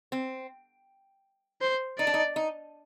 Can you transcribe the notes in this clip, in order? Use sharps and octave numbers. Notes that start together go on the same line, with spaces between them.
C4
C5
D#4 D5
D4
D#4
D#4